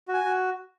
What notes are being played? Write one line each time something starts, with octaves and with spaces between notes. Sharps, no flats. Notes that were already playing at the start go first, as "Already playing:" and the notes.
F#4
G#5
F#4